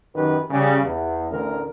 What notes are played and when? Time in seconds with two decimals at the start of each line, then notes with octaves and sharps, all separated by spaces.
0.15 F#2 D#3 G4 B4
0.50 C#3 G3
0.83 E2
1.30 A1 D2 A#4